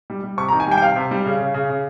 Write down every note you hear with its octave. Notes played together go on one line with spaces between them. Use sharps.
G3
G3
C3 C#6
A#5
D#3
G#5
G3 G5
G5
C3 F5
C3
G3
C#3
C#3
C#3
C#3